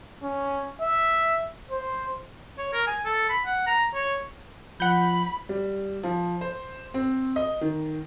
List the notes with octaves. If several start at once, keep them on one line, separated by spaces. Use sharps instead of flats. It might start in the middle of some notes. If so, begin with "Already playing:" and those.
C#4
E5
C5
C#5
A#4
G#5
A4
B5
F#5
A#5
C#5
F3 F#5 B5 G6
G3
F3
C5
C4
D#5
D#3